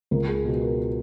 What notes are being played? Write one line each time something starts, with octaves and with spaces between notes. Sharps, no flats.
C#2 A#4
G#4
B2 F#3 F#4
A#4